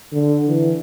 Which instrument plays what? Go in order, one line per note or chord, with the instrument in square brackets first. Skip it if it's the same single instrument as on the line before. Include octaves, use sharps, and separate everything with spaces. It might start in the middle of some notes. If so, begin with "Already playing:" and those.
[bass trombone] D3
E3